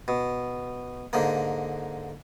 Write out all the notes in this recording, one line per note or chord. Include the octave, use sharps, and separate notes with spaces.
B2
G#2 D3 A#3